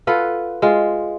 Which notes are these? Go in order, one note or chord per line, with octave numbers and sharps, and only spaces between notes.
F4 A4 B4 F#5
G#3 F4